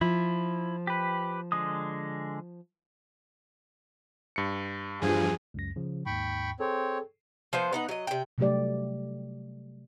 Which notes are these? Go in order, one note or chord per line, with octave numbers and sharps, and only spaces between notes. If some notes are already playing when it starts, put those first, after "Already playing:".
F3 E4
G4 B4
D3 G#3 D#6
G2 C#7
E2 G2 F3 G#4
C#2 F#2 A#6
C#3 F3
D#2 G#2 G5 B5 C#6
C4 G#4 A4 C#5
F3 B3 C5
B3 D#4 F#5
F#3 D#5
C3 G5
C3 F#3 G3 A3 G4 D5